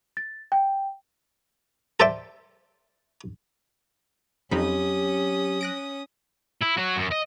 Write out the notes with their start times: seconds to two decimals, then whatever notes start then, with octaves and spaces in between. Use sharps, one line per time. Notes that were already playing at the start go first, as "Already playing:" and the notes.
0.17 A6
0.52 G5
2.00 A4 C5 D5 E5 G5
4.51 F2 F#3 C4 C#4 D#4 G4 B5 D#6
5.61 F#6 A#6 D7
6.62 E4
6.78 F#3 F#4
6.97 F#2
7.12 D#5